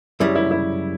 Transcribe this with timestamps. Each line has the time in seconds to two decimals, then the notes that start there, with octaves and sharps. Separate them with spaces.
0.20 F#2 C#3 G3 E4
0.35 E4
0.51 E4